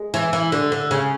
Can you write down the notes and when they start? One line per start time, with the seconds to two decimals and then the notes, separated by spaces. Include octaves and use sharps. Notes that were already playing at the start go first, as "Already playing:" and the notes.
Already playing: G#3
0.14 E3
0.33 E3
0.52 D3
0.72 D3
0.91 C#3